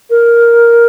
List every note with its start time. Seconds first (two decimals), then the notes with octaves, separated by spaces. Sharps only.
0.10 A#4